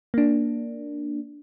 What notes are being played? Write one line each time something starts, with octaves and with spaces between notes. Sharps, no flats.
A#3 D4